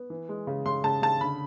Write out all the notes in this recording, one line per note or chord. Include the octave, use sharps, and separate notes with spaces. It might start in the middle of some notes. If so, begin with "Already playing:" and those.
Already playing: B3
E3
G#3
C#3
C#3 C6
C#3 A5
C#3 A5
D3 B5